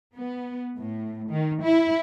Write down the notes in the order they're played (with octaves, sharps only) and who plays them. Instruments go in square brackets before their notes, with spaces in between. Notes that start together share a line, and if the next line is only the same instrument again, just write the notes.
[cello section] B3
A2
D#3
E4